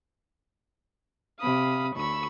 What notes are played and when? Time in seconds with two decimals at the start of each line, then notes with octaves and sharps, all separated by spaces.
1.40 C3 F5 B5 D#6
1.96 D2 B5 C#6 E6